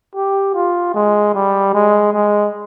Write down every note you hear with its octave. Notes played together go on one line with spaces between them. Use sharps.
G4
F4
G#3
G3
G#3
G#3